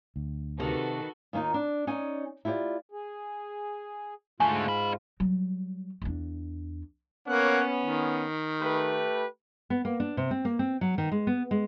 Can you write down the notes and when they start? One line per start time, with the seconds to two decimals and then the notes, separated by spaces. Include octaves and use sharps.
0.16 D2
0.60 C3 D#3 F#4 A4 B4
1.33 D#2 A#3 C#4 D#4 F4
1.54 D4
1.87 C#4 D#4 D5 G#5
2.45 E4 F4 G4 C#5 D5
2.92 G#4
4.40 G#2 D3 A3 F4 G#5
4.68 D#5 B5
5.20 F#3 G3
6.02 E2 D4
7.28 A#3 B3 C#4 C#5 F#5
7.82 D#3
8.61 A3 G4 B4
9.70 B3
9.85 A#3
10.00 D4
10.17 C3
10.31 C4
10.45 A#3
10.59 C4
10.81 F#3
10.98 D#3
11.11 G#3
11.27 B3
11.51 G#3